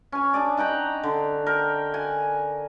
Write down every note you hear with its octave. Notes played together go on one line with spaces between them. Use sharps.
C#4 G#5
D4 G#4 D5
D#4 F#5 G5 A#5
D3
A#4 G5
F#5 G#5